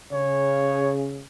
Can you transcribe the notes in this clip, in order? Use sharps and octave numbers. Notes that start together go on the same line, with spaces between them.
C#3 C#5